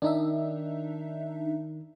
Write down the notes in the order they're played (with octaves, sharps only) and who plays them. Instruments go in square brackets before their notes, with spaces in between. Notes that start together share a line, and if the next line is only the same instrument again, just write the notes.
[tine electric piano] D#3 [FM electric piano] D4 D#4 E5